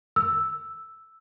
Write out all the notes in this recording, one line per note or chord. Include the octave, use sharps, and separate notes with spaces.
E6